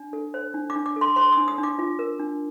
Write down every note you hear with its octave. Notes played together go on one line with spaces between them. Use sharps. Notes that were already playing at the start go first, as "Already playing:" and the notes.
Already playing: D4
A4
C5
D4
D6
D4
D6
A4
C6
C5 C6
D#6
D4
D#6
D4
D6
F4
A#4
D4